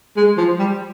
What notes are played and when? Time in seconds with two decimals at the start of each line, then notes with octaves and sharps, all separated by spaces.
0.17 G#3
0.37 F3
0.59 G3